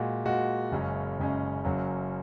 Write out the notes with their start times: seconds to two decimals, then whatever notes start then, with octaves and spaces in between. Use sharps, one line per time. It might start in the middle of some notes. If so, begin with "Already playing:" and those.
Already playing: A#2 G#3 F#4
0.25 A#2 G#3 F#4
0.72 F#1 F#2 C#3 G#3 C#4
1.19 F#1 F#2 C#3 G#3 C#4
1.65 F#1 F#2 F#3 C#4